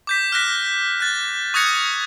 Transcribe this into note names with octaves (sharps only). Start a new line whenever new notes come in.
D6 G6 B6
F6 F#6 A#6 B6
F#6 A6
C#6 D#6 F#6 G#6 A#6 C#7